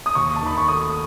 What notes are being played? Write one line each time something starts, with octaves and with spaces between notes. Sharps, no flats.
D#6
D#2 C#6
A5
D#3 B5
C#6
A3 D#6